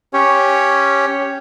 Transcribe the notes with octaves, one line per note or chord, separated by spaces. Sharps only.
C#4 G4 C#5